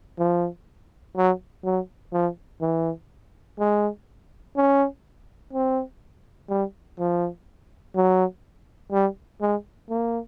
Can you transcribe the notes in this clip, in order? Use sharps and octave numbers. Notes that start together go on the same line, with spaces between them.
F3
F#3
F#3
F3
E3
G#3
C#4
C4
G3
F3
F#3
G3
G#3
A#3